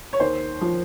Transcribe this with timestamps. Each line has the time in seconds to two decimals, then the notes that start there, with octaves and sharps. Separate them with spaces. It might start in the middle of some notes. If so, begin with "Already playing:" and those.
0.13 C#5
0.20 D#2 C5
0.61 F3